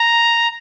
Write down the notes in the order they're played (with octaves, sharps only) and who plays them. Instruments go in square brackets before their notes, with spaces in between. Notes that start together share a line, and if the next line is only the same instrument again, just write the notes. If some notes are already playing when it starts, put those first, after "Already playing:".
Already playing: [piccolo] A#5